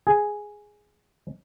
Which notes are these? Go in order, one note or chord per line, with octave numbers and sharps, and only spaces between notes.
G#4